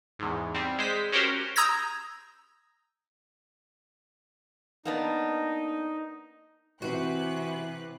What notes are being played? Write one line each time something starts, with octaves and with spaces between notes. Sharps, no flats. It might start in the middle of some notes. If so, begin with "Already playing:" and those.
E2 G#2
G3 C4
G#3 C5 B6
C#4 F#4 G4 A#4 C5
A#5 D#6 E6 G6 G#6 A#6
A#3 B3 D4 D#4
C3 E3 F#4 B4 F#6